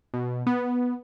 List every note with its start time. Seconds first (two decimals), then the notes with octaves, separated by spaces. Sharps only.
0.14 B2
0.46 B3